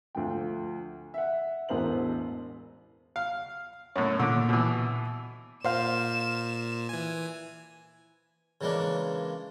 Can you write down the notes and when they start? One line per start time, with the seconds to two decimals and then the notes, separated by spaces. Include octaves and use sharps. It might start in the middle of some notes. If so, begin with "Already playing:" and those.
0.15 D2 F3 G5
1.14 E5 F#5
1.69 E1 A1 B3 A#4 C5 F#7
3.16 F5
3.96 F#2 A2 C#5
4.20 A#2 D3 D#3 D6
4.49 B2 E3
5.65 A#2 C5 F5 E7
6.89 E3 G#5
8.61 C#3 E3 G#3 A#3 D4